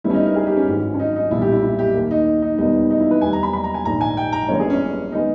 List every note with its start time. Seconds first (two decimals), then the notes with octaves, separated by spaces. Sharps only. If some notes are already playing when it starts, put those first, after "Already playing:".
0.04 G1 G2 G3 B3 E4
0.10 C#4
0.14 D#4
0.26 A#4
0.36 G#4
0.47 G4
0.57 C#4
0.68 G#1 G#2 E3
0.94 C#4
0.99 D#4
1.16 D#4
1.31 B1 A#2 G3 E4
1.42 G4
1.52 E4
1.62 E4
1.79 G4
1.94 D#2 D#3 A#3
2.11 D#4
2.42 D#4
2.58 E1 E2 D#3 G3 B3 D#4
2.90 D#4
3.00 E4
3.11 B4
3.21 E2 D#3 G3 G#5
3.33 A#5
3.43 B5
3.53 B5
3.64 A#5
3.74 G#5
3.85 A#1 G#2 D#3 A#5
4.01 G#5
4.17 G5
4.32 A#5
4.49 G1 G2 E3 A#3 C#5
4.60 G#4
4.70 C#4
5.12 D#3 G#3 B3 D#4